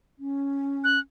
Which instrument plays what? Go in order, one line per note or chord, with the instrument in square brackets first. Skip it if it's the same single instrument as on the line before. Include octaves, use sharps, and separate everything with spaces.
[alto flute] C#4
[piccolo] F#6